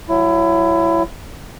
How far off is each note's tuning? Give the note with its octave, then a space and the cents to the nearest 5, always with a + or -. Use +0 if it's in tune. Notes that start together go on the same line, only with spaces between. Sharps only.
F#3 +0 E4 +25